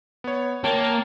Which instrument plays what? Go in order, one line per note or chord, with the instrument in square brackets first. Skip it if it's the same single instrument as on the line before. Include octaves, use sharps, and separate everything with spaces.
[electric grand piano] B3 C#5
[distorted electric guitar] A#3 [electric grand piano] C#5 G5 [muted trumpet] A5